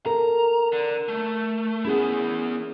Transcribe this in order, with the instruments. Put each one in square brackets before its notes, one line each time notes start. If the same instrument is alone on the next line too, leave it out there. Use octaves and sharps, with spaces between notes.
[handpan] A4 A#4 [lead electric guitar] A#5
[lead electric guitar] D3
A3
[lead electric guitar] B3 E4 [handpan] C#4 G#4